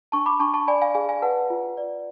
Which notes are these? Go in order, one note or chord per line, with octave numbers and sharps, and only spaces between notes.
D4 A5 C#6
B5 D6
D4 A5 C#6
A5 C#6
D5 G#5 B5
F5 G#5
G#4 F5 G#5
F5 G#5
B4 F#5 A5
F4
D5